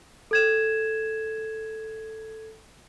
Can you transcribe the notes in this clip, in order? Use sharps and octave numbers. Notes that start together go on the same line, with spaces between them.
A4 G#6 E7